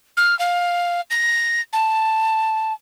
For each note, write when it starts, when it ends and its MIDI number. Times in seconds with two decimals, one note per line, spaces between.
0.17 0.37 89
0.39 1.01 77
1.10 1.61 94
1.73 2.73 81